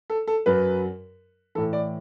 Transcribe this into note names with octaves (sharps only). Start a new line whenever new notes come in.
A4
A4
F#2 F#3 B4
A2 E3 A4
D5